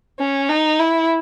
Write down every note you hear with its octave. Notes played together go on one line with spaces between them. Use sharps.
C#4
D#4
E4